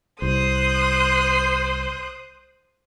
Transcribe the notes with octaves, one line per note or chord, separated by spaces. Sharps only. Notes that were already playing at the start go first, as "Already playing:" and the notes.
C2 C5 D#6 F#6